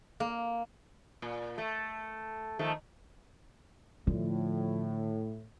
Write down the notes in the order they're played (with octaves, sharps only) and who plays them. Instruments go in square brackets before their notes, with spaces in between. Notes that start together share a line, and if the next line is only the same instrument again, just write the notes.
[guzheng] A#3
[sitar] A#2
A3
D#3 F3 A3
[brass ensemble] A2 [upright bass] D3 [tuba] F3